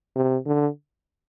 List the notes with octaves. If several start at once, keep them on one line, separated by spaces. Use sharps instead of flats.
C3
D3